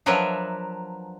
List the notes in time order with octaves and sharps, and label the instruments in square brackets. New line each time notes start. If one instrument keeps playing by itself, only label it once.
[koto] F3 F#3 D4 A#4 B4 E5